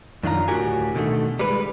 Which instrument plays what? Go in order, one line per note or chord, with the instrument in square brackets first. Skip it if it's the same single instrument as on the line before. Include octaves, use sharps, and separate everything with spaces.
[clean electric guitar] F#2 D#3 D4 F4 A#5
D2 A2 F#4 G4 A#4 G#5
B2 D3 D#3 A3
G3 G#3 B4